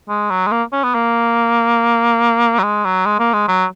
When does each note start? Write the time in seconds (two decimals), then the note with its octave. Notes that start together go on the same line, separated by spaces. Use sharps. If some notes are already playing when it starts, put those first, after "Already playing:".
0.09 G#3
0.30 F#3
0.47 G#3
0.52 A#3
0.73 C#4
0.84 B3
0.94 A#3
2.59 F#3
2.63 G#3
2.85 F#3
3.06 G#3
3.19 A#3
3.33 G#3
3.48 F#3